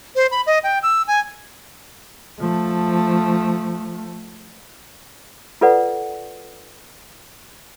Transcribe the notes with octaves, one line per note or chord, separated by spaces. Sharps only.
C5
B5
D#5
G5
E6
G#5
F3 A3
F4 A4 B4 D5 F#5